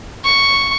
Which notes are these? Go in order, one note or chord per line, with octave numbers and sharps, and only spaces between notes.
C#6